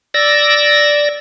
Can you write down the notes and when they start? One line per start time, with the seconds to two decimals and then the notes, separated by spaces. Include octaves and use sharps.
0.14 D5 E6 A#6